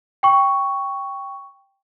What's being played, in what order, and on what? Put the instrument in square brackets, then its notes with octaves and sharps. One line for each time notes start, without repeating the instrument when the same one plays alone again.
[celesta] G5 C#6